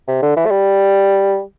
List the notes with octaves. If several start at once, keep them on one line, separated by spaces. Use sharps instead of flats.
C3
D3
E3
A3
G3